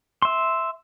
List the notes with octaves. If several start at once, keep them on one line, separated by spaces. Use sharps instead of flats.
E5 C6